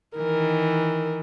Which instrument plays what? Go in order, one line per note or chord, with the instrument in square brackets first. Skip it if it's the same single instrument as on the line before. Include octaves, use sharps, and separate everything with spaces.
[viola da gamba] D#3 E3 [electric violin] A#4